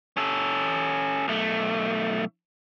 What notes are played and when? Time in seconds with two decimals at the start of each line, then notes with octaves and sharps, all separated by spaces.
0.17 C#4 A4
1.28 B1 A3